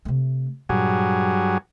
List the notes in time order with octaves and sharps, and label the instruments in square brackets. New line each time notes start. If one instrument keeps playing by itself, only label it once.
[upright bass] C3 A3
[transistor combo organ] G2 F#3 G#4 [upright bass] A#2